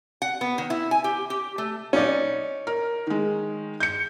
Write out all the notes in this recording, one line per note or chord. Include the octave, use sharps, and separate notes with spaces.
F#5
B3
D#3
E4
G#5
G4
G4
A3
C#4 D#4 D5
A#4
D#3 G#3
G6 C#7